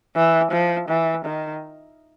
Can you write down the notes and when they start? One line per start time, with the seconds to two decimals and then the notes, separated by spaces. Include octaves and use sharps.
0.16 E3
0.52 F3
0.89 E3
1.25 D#3